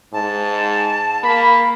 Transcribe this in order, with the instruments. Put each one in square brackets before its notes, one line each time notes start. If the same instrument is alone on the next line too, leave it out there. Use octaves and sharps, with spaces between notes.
[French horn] G#2 [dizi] A5
[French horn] A#3 [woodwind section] B5